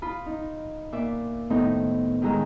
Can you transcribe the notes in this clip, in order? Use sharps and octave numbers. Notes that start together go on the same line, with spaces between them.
F4 B5 D#6
D#4
A#2 E5 D6
A2 D#3 A3 B3 C4 D#4
D#3 F#3 G#3 A#5 E6